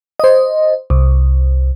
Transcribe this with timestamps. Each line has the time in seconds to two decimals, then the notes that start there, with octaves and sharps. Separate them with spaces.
0.20 C5 D#5
0.90 C2